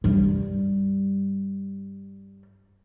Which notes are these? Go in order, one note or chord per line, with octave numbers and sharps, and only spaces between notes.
G2 G3